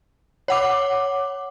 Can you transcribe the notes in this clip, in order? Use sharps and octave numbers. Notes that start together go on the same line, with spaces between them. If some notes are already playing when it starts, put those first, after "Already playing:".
C#5 F#5 D6